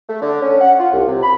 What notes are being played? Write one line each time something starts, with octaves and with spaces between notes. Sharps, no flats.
A3
D3
C#4
F#5
F4
C2
C3
B5